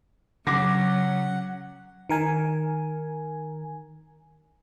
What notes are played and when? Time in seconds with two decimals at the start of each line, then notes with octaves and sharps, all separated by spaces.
0.47 C#3 F#3 F#5 D6 A#6
2.09 D#3 A#4 G#5